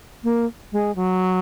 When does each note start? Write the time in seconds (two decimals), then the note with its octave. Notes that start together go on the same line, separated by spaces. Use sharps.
0.24 A#3
0.72 G#3
0.96 F#3